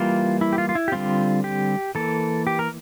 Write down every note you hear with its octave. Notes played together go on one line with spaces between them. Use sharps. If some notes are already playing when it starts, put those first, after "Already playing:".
Already playing: E3 G3 A#3 F4
E4
G4
F4
F4
E4
G4
D3 G3 C4 F4
G4
E3 A#3 A4
G4
A#4